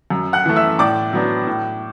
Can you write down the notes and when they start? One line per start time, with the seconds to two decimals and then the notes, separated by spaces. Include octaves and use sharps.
0.10 F#2
0.33 F#5 F#6
0.46 E3 A3
0.56 E5 E6
0.79 A2 D5 D6
1.13 F#3 B3 D4
1.47 A2